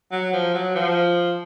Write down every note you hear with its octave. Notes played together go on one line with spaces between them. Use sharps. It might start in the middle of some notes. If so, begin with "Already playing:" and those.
F#3
F3
F#3
F3